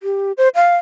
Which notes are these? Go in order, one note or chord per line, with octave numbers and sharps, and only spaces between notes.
G4
C5
F5